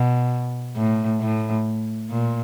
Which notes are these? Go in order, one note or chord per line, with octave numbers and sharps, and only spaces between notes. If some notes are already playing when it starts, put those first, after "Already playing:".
Already playing: B2
A2
A2
A#2